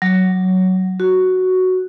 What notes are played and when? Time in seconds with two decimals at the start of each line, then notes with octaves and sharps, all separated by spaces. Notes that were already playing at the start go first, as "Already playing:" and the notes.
0.02 F#3
1.00 F#4